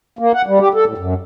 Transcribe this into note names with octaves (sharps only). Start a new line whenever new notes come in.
A#3
F#5
G3
G4
A4
A2
F#2